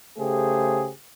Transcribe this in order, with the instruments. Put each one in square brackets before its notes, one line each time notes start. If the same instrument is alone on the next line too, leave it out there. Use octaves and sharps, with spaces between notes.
[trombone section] C#3 A3 G4 G#4 C5